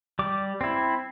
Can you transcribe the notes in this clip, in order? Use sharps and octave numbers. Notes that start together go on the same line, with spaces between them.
G3 D6
C4 E4